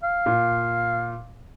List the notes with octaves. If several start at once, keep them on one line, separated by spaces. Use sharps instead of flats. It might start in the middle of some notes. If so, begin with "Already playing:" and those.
F5
A#2